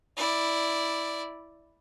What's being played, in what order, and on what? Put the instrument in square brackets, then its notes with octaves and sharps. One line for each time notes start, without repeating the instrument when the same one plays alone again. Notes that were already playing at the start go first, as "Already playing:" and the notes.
[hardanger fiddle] E4 D5